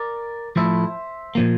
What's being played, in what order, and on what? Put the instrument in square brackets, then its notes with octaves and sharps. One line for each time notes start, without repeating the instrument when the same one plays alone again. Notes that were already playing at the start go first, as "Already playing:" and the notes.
Already playing: [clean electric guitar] A#4 D5
A2 F3 A3 E4 C5 E5
A#2 F3 A#3